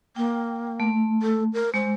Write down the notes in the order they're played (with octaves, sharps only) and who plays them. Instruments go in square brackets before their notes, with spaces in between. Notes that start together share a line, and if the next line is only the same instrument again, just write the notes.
[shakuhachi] A#3 [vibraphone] G5
[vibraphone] A3
[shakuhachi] A4
A#4
[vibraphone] G#3 [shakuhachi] C5